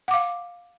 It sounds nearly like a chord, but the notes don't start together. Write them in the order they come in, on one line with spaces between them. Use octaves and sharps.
F#5 D6 F5